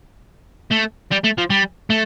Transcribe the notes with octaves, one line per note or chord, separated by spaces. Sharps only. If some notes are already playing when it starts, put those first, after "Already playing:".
A3
G3
A3
F3
G3
A3